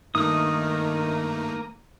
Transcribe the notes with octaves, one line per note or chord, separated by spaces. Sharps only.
G2 D#3 A3 A#3 D#4 D#6